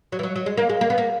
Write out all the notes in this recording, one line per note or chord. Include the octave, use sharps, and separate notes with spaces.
F#3
E3
F#3
F#3
G#3
A#3
G#3
A#3
B3
A#3